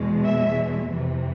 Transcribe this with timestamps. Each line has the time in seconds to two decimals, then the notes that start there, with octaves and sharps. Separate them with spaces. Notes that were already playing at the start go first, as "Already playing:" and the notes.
Already playing: E2 B2 G#3
0.25 E5
0.92 F2 C3 E3